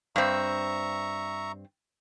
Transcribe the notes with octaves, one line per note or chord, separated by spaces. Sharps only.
G2 C4 E5 A#5 C#6